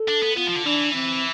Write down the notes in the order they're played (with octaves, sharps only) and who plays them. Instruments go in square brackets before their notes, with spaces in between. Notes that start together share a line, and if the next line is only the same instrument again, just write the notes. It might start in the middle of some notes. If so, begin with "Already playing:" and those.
Already playing: [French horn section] A4
[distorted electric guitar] D4
B3
[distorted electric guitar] B3 [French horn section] F4
[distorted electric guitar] F3
D3
[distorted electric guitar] E3 [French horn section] D4
[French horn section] C4